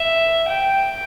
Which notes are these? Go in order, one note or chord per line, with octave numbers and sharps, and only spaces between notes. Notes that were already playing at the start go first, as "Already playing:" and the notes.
Already playing: E5
G5